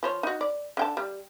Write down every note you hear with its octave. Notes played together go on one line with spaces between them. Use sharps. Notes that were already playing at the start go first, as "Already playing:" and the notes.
F3 C5 C#5
D#4 F#4
D5
D3 G5 A5
G3